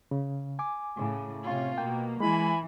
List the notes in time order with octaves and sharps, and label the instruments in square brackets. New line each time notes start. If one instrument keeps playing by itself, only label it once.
[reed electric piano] C#3
G#5 D6
[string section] A2 C#3
C3 C#4 F4
[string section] B2 A#3 [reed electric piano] G5
[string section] E3 [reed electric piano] G#3 [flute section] E4 G#5 B5